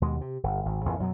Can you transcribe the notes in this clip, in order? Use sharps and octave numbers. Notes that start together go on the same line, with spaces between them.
D#2 B2 G#3
C3
G1
G#1
A#1 F2 A2 E3
F#2 B2 F#3